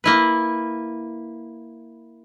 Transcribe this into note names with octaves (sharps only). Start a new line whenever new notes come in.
A#3 E4 B4